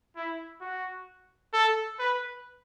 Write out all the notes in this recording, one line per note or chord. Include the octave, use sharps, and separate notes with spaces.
E4
F#4
A4
B4